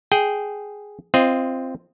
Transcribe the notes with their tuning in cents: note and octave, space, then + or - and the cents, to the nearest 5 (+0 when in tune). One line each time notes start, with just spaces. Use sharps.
G#4 +0 G5 -5
C4 +0 F4 -20 D#5 +0